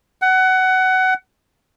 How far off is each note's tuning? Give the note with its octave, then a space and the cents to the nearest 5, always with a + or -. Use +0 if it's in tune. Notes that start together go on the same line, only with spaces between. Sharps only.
F#5 +20